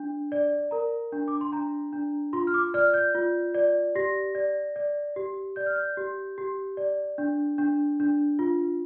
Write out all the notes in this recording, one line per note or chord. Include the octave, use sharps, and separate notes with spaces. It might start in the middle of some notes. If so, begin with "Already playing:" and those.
Already playing: D4
D5
A#4 A#5
D4
D6
C6
D4 A#5
D4
F4 C6
F6
D6
D5 F6
G6
F4
D5
G4 A#6
D5
D5
G4
D5 G6
F6
G6
G4
G4
D5
D4
D4
D4
F4